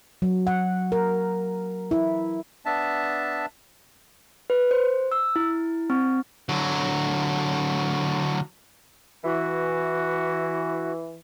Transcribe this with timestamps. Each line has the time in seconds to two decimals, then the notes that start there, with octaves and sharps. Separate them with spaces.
0.22 F#3
0.47 F#5
0.92 A#4
1.91 E4
2.66 B3 D4 E5 A5
4.50 B4
4.71 C5
5.12 E6
5.36 E4
5.90 C4
6.49 D3 F#3
9.24 E3 F#4